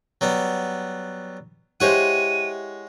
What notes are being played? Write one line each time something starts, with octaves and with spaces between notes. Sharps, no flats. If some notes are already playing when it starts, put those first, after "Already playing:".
F#3 G3 B3
G#3 E4 G4 C5 C#5 F#5 D#7